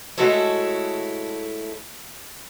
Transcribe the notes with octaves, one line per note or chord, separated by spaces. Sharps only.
G#3 A3 E4 F#4 A4 C#5